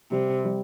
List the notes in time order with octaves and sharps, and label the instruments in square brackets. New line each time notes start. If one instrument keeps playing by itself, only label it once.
[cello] C3 [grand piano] G3
[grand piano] G3